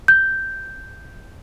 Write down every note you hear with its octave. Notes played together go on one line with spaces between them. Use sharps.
G6